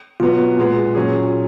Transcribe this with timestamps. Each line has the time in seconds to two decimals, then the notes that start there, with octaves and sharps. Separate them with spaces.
0.20 B2 F#3 B3 F4
0.57 A#2 G#3 B3
0.95 A#2 F#3 C#4 G#4